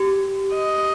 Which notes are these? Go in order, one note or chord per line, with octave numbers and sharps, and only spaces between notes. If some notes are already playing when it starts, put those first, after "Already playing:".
Already playing: G4
D#5